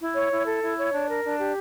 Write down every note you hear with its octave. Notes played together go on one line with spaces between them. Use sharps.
E4
C#5
E4
A4
E4
C#5
D4
A#4
D4
G4